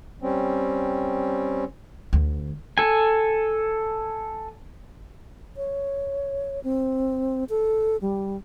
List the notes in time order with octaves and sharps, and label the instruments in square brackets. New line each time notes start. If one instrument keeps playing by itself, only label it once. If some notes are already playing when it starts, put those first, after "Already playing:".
[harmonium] G3 C4 C#4
[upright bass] D2
[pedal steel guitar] A4 G#5
[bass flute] C#5
C4
A4
G3